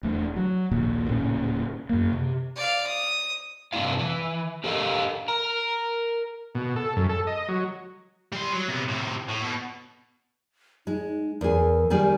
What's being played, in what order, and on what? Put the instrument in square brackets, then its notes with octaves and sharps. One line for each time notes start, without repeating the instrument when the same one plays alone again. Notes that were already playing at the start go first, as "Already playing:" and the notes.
[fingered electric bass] E1 A3 D4
F#3
A#1 D#2 A#2
D1 A#2 C#3 C#4
F#2 A#3
C3
[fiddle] D5 F5
D#6
[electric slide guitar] G2 C3 C4 D4 E4 F5
E3
D4 G4 A4 A#4 D#5 F5
A#4 A#5
[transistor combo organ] B2
A4
F#2
A4
D#5
F#3
[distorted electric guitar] G3 C6
F#3
C3 B3
A2 C3
A2
B2
[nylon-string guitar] G#3 [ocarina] D#4
[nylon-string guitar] E2 G#4 [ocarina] A#4
[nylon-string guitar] D#3 G3 G#4